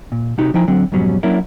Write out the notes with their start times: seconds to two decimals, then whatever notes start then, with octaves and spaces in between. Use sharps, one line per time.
0.12 A#2
0.38 C3 D#4 F#4 G4
0.54 F3 D#4 E4 G5 G#5 A#5
0.68 D3 F#3 C4
0.92 F2 G#2 B2 F#3 G3 C#4
1.23 F#3 A#3 C#4 D4 E4 A#4